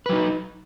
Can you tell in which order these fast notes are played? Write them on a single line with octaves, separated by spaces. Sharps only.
B4 F#3 D#4